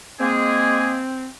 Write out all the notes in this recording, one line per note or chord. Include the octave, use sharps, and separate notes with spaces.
G#3 A#3 C4 G#4